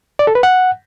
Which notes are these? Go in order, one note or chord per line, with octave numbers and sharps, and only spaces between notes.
D5
A4
B4
F#5